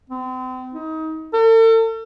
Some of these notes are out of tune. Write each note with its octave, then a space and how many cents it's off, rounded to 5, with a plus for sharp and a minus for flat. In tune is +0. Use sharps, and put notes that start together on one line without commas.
C4 -35
D#4 +30
A4 +40